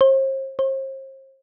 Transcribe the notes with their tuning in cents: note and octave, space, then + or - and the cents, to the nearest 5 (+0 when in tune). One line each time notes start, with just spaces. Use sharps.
C5 +40
C5 +40